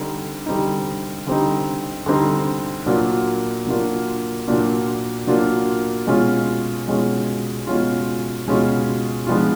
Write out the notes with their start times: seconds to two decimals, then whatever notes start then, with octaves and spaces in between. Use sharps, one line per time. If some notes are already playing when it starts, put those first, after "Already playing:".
Already playing: D3 G3 C4 D#4
0.46 D3 G3 C4 D#4
1.27 D3 G3 C4 D#4
2.06 D3 G3 C4 D#4
2.86 A#2 F#3 A#3 D4 F4
3.67 A#2 F#3 A#3 D4 F4
4.48 A#2 F#3 A#3 D4 F4
5.27 A#2 F#3 A#3 D4 F4
6.07 B2 G#3 C#4 F4
6.88 B2 G#3 C#4 F4
7.67 B2 G#3 C#4 F4
8.48 B2 G#3 C#4 F4
9.27 F3 G#3 B3 D4 F4